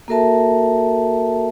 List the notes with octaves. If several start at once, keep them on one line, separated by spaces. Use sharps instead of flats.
A#3 F#4 A4 A#4 E5 A5